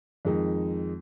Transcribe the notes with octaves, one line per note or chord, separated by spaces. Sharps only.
F2 D#3 G#3 D#4